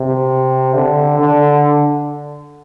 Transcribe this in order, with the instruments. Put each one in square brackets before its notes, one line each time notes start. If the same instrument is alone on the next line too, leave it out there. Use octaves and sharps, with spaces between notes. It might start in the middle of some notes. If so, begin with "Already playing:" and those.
Already playing: [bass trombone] C3
D3
D3